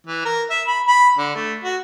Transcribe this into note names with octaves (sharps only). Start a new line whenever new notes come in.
E3
A#4
E5
B5
B5
D3
A3
F#4